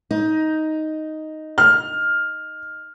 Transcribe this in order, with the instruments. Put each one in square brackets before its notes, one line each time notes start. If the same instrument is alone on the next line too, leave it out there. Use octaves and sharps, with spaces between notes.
[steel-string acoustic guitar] D#4
[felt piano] F6